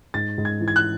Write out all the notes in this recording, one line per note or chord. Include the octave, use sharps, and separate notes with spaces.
G#2 A6
G#2
G#6
E3
G#6
F#6